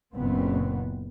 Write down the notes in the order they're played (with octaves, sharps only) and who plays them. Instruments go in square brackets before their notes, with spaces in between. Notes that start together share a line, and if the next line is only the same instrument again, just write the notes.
[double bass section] F#1 A#2 B3 C4